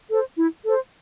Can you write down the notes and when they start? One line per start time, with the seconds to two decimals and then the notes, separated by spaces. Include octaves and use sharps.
0.10 A4 C5
0.38 E4
0.64 A4 C5